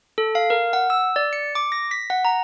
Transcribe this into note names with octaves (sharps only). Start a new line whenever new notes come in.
A4
F5
A#4
F#5
E6
D5
C#7
D6
A#6
B6
F#5
A#5